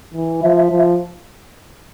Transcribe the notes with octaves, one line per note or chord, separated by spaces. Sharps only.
E3
F3 E5
E5
F3